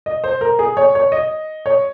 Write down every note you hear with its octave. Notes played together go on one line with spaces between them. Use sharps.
D#5
C5
A#4
G#4
C#5
C#5
D#5
C#5